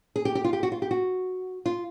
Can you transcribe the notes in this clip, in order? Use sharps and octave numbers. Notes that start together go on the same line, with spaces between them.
G#4
G4
G4
F4
G4
F#4
F4
G4
F#4
F4